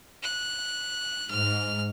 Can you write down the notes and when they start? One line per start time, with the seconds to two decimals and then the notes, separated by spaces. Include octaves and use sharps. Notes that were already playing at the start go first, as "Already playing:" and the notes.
0.23 F#6
1.31 G#2 F6